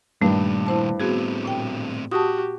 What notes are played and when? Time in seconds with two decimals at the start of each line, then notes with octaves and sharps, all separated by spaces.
0.22 G2 A#2 D#3 A3
0.67 E4 C5 A5
1.00 A2 B3 C4 F#4 G#4
1.45 A#2 G5
2.11 F#4 G4 A5 D#6